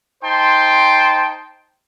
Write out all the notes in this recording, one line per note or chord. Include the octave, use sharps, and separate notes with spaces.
D#4 C5 G5 A5 C6